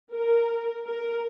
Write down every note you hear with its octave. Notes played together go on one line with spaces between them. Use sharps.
A#4
A#4